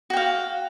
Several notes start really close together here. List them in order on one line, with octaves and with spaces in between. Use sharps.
F#4 G5 F5